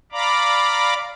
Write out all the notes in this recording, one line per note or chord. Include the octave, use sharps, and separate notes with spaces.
D5 F5 A#5 B5 D6